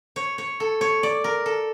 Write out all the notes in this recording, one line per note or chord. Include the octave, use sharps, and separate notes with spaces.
C#5
C#5
A4
C#5
D5
A#4
A4